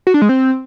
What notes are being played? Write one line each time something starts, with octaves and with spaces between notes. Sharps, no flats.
F#4
D4
G#3
C4